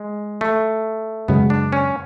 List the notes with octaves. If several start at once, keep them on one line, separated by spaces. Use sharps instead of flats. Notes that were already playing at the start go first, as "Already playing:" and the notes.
Already playing: G#3
A3
F#2 C#3 G#3 B3
D4
C#4